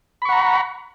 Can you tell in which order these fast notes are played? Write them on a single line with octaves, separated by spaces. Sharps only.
B5 C#6 F#5 A#5